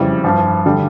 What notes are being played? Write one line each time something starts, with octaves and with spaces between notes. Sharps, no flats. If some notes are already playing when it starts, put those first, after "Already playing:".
Already playing: F2 C#3 E3 G3
G2 F3
D3 G3